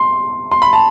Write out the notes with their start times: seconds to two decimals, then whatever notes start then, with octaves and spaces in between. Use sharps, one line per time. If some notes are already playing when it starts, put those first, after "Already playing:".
Already playing: C6
0.51 C6
0.62 B5
0.73 A5